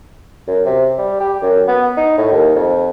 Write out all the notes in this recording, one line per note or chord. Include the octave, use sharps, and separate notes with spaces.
F#2
C3
G3
G4
F#2
B3
D#4
A2
D#2
F2